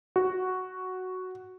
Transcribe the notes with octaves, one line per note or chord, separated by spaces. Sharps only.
F#4